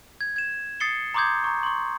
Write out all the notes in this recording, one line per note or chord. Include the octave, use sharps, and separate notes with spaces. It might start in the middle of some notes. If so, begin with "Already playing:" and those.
G#6
G#6 E7
D#6 A6 C7 C#7 G7
A#5 C6 D6 D#6 G6 G#6
A#5 C#6
C6 C#6